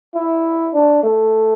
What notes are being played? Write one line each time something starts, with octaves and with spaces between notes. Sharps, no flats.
E4
D4
A3